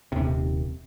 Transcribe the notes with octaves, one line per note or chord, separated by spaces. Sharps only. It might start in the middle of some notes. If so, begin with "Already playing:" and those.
D#1 D#2 C3